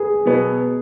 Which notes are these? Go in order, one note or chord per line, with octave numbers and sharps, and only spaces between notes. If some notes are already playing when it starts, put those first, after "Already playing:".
Already playing: G#4 B4
B2 F#3 B3